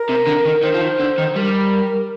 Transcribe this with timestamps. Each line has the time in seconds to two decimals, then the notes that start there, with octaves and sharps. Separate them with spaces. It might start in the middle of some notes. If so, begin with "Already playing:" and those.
Already playing: A#4
0.09 C3
0.27 D3
0.45 D#3
0.63 D#3 C5
0.74 F3
0.81 D#3
1.00 D3
1.18 D#3
1.36 G3 A#4